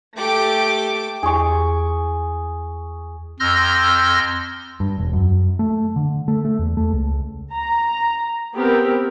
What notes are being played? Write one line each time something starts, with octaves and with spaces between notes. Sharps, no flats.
A3 G4 D6
E2 G#4 C#6
F2 C6 E6 F6 G6 A#6
G2
E1
F#2
A3
D3
A3
A3
E2
A3
C#2
A#5
B3 C4 G4 A#4